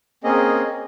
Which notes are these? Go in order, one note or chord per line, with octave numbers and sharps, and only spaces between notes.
A#3 C4 C#4 G#4 D#5